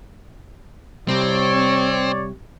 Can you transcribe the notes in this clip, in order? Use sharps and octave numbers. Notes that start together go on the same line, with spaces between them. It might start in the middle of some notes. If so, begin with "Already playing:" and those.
C3 G3 C4 C#5 D5